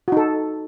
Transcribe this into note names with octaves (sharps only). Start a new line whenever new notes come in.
D#4 F#4 A4